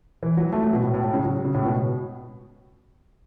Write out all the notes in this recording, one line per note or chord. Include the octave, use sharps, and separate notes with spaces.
E3
F#3
A3
F#3
B2
A2
A2
A2
C#3
F#3
C#3
A2
B2